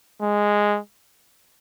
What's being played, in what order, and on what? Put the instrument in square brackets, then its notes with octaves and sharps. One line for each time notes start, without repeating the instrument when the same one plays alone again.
[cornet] G#3